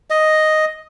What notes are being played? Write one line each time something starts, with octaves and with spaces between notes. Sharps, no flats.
D#5